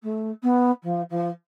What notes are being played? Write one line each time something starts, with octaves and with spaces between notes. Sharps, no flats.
A3
B3
F3
F3